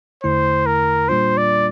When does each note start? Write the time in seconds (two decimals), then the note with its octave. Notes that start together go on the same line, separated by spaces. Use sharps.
0.23 E2 D3 A3 E4 C5
0.66 A#4
1.09 A#2 G3 A#3 D4 F4 C5
1.37 D5